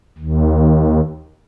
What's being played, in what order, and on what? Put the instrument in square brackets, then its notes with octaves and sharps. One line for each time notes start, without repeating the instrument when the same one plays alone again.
[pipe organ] D#2